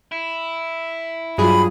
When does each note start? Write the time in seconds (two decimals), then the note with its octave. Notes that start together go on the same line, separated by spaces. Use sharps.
0.12 E4
1.38 G2 F#3 F4 G#4 B5